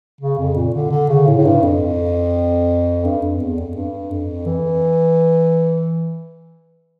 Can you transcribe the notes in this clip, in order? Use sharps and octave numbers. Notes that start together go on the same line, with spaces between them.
C#3
F2
A#2
D3
D3
C#3
A2
A2
G2
F2
G2
F2
E2
F2
G2
F2
E3